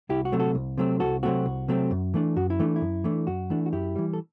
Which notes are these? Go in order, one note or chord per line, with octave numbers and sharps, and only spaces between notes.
C2 E4 G4
F#4
C3 F#3 A3 C4
F#4 A4
C2
C3 F#3 A3 C4
C2 F#4 A4
C3 F#3 A3 C4 F#4
C2
C3 F#3 A3 C4
F#2
E3 A3 D4
F#2 F#4
E4
E3 A3 D4
E4
F#2
E3 A3 D4
F#2 F#4
E3 A3 D4
F#4
F#2 E4 G4
E3 G3
A4